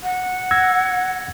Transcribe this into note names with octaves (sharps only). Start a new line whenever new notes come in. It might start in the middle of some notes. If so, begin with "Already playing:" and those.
F#5
E6 G#6 A#6